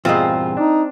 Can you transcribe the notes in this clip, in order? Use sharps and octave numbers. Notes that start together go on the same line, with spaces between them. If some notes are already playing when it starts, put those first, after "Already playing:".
E2 G2 A#2 C4 F4 G#4 D#5
D4 D#4